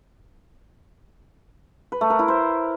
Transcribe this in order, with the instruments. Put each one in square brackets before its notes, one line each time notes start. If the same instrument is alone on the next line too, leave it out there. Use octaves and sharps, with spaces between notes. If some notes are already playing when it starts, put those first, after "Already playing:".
[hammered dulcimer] B4
A3
A#4
E4
C5